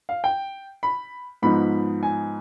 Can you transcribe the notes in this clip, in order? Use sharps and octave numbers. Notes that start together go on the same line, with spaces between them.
F5
G5
B5
G#2 F3 B3 D#4 B5
G#5